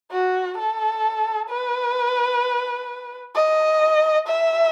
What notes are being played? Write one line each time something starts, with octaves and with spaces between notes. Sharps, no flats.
F#4
A4
B4
D#5
E5